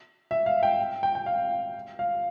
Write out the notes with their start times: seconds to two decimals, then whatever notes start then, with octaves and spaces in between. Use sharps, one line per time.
0.31 E5
0.46 F5
0.63 G5
1.03 G5
1.15 G5
1.26 F5
1.99 F5